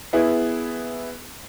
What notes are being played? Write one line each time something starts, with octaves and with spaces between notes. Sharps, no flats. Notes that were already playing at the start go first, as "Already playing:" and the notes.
B3 E4 G#4